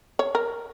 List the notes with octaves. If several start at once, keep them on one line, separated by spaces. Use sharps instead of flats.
C#5
A#4